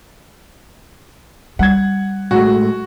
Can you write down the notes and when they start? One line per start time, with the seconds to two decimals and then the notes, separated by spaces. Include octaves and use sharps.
1.59 G3 F#5 G#6
2.31 A2 G#3 A3 F#4